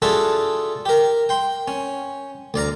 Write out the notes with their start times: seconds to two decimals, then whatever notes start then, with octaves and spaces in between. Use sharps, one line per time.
0.02 D4 F4 F#4 G#4 A4 E5
0.85 G4 A#4
1.29 G5 C6
1.68 C#4
2.54 D2 D5 F5 A#5